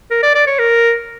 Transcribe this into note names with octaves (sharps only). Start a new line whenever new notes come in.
A#4
D5
D5
C#5
A#4